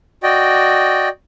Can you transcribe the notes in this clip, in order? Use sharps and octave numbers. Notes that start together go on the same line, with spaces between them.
F#4 D5 D#5 G5